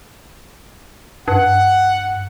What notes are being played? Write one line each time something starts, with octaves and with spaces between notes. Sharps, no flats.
G2 F#5